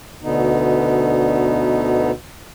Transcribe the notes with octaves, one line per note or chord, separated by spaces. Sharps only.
D2 B2 D3 B3 D#4